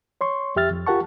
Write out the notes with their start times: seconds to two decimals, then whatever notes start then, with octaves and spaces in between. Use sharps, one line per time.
0.21 C#5 C6 C#6
0.56 F2 G4 E5 F6 A6
0.70 F2
0.86 F4 G4 A#4 F#5 A5 C#6